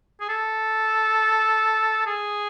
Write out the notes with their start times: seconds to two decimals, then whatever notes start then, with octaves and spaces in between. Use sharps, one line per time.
0.20 G#4
0.29 A4
2.06 G#4